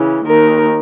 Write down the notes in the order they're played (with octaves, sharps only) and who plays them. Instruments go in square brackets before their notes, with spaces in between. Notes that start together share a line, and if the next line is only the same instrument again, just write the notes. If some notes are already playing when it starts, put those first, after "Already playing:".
Already playing: [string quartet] C#3 E3
D#2 D#3 A#4